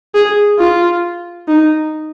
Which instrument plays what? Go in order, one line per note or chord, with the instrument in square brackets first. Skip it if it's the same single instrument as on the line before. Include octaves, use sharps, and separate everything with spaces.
[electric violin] G#4
F4
D#4